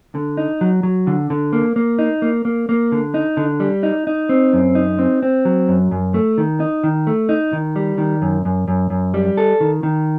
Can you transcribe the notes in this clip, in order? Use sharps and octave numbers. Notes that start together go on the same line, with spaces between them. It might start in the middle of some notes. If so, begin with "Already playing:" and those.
D3
D#4
F#3
F#3
D3
D3
A#3
A#3
D#4
A#3
A#3
A#3
D3
D#4
D3
G3
D#4
D#4
C4
F#2
D#4
C4
C4
F#3
F#2
F#2
A3
D#3
D#4
D#3
A3
D#4
D#3
G3
D#3
F#2
F#2
F#2
F#2
G3
A4
D#3
D#3